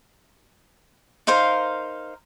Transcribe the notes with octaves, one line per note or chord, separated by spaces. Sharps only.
D#4 A#4 C5 F5